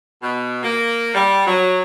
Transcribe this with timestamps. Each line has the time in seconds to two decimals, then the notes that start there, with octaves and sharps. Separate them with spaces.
0.21 B2
0.62 A#3
1.14 G3
1.46 F#3